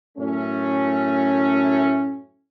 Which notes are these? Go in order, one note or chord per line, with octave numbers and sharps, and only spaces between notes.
F#2 A2 A3 C#4